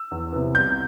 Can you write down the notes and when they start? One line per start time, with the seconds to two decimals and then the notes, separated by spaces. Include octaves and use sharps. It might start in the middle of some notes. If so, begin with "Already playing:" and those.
Already playing: E6
0.11 E2
0.32 C3 E3 B3
0.55 C2 G6